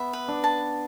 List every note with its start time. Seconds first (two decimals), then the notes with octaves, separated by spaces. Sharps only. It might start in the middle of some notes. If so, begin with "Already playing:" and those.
Already playing: B3 E5
0.13 B4
0.28 D4
0.44 A5